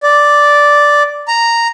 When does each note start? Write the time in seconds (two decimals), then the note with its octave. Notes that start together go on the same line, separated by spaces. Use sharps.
0.03 D5
1.28 A#5